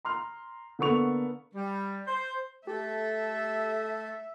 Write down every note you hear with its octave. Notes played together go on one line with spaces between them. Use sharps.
A#5 C6 F6
D3 A#3 B3 A4 C#6 F7
G3
C5
A3 G4 A4 E5